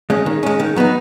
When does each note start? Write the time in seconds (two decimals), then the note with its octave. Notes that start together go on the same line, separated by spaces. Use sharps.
0.10 G#3 C#4
0.26 D#3
0.43 G#3 C#4
0.60 D#3
0.76 F#3 B3 D#4